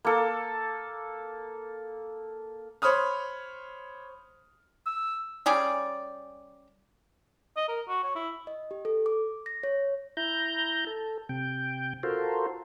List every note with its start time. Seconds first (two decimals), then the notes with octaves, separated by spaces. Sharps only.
0.05 A#3 A4
2.82 C5 C#5 B5 D#6 F6
4.87 E6
5.46 G3 C#4 G#4 D5
7.56 D#5
7.68 A#4
7.88 F#4
8.03 C#5
8.15 E4
8.47 D#5
8.71 G4
8.85 A4
9.06 D6
9.46 A#6
9.63 C#5
10.17 E4 A#5 G6
10.87 A4
11.29 C3 G5
12.03 F4 F#4 A4 A#4 C5